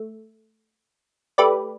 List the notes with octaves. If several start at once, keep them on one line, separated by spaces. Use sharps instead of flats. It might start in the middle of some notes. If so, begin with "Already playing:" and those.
Already playing: A3
A3 G4 B4 D5